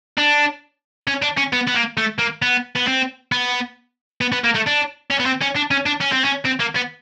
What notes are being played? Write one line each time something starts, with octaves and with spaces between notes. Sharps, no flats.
D4
C#4
D4
C#4
B3
B3
A#3
A3
A#3
B3
B3
C4
B3
B3
B3
A#3
A3
D4
C#4
B3
C4
C#4
D4
C#4
D4
C#4
C4
C#4
C4
A#3
B3